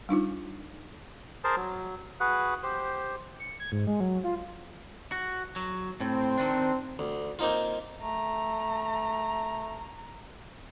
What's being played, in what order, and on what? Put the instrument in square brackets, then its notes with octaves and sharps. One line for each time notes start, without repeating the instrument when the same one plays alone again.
[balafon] G3 D4 D#4 F4
[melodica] G#4 A#4 C5 A5
F#3
F#4 G#4 B4 F#5
G4 C5
[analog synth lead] C#7
G#6
G#2
G#3
F#3
F4
[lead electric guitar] F#4
F#3
[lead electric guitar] A2 [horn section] C4
[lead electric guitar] D#3 D4
[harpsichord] D2
A#3 C4 D#4 F4
[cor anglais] A3 [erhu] A#5